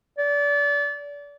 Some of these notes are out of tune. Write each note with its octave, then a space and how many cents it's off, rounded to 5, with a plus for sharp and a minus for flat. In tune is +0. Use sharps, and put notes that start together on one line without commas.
D5 -30